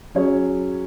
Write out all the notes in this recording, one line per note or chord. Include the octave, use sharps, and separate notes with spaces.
F#3 C#4 G#4 C#5